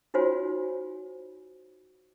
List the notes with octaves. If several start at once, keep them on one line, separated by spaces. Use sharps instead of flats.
D#4 F4 F#4 C5 C#5 G#5